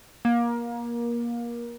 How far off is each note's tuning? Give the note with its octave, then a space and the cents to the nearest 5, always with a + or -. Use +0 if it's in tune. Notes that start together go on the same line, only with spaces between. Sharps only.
A#3 +25